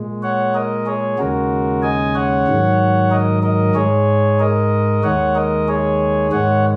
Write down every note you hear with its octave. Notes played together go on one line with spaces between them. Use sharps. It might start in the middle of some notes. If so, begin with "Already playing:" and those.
Already playing: A#2 G#3
C#5 F#5
A#4 D#5
G#4 C#5
D#2 C#3 G#3 F#4 A#4
D#5 G#5
C#5 F#5
G#2 D#3 F#3
A#4 D#5
A#4 D#5
G#2 G#3 G#4 C#5
A#4 D#5
D#2 D#3 G#3 C#5 F#5
A#4 D#5
G#4 C#5
G#2 D#3 G#3 C#5 F#5